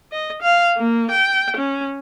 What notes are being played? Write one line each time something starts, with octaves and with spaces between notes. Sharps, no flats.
D#5
F5
A#3
G5
C#4